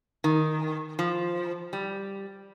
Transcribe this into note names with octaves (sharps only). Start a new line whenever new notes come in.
D#3
F3
G3